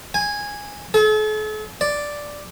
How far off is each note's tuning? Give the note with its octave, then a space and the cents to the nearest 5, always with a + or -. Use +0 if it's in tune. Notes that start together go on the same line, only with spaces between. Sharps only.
G#5 -10
A4 -45
D5 +0